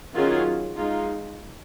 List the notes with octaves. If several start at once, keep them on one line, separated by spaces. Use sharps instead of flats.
D#3 F#3 C#4 F4 G#4
G#3 D#4 F4